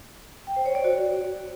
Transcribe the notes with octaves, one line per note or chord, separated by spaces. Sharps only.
G5
C5
C#5
D5
F#4